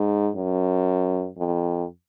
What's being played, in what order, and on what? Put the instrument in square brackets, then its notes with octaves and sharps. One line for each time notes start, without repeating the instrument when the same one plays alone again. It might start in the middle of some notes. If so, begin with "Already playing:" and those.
Already playing: [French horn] G#2
F#2
F2